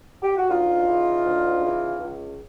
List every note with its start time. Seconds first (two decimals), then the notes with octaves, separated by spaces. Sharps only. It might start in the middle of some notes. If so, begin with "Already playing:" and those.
0.22 G4
0.36 F#4
0.49 D2 D#4 F4
0.88 C#3 E3
1.25 D2
1.62 C#3 E3
1.99 C#2